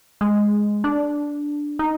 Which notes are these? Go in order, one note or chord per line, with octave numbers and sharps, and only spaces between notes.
G#3
D4
D#4